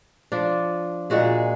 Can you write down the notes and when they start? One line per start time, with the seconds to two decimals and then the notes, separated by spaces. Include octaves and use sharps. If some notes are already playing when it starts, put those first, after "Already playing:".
0.32 F3 D4
1.10 A#2 G#3 F#4 G#4